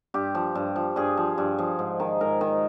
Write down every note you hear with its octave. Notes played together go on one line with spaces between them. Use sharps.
G2 G4
F3
G2
F3
G2 G#4
F3
G2
F3
G#2
D#3
G#2 A#4
D#3